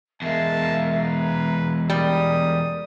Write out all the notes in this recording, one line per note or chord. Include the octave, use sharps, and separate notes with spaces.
E2 G#3 F4 A#4 E5 A5
B4 A#5
G3 A#4 D#6